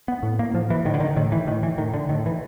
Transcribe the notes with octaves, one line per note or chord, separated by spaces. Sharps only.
B3
A2
A#3
A2 F3
E3
A2 D#3
D3
D#3
A2 D#3
E3
A2 D#3
E3
A2 D#3
D3
A2 D#3
E3